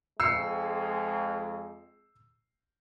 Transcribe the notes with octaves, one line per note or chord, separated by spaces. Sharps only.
F2 G#3 E6 C7 C#7